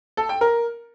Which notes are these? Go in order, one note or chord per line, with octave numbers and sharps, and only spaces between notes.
A4
G5
A#4